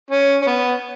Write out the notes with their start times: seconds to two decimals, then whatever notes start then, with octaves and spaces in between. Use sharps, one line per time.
0.11 C#4
0.42 C#4
0.47 B3